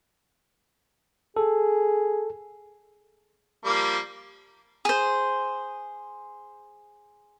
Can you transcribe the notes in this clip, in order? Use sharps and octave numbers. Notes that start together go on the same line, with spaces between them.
G#4 A4
F3 G3 A#3
G#4 C5